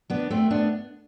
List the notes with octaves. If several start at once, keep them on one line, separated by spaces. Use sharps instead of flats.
B3 D4
A3 C4
B3 D4